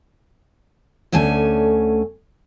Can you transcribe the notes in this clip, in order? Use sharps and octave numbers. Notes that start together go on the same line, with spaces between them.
D2 D3 A3 C#4 G#5